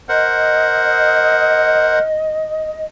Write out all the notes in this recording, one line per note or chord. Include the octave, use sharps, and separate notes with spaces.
A#4 C5 D#5 F#5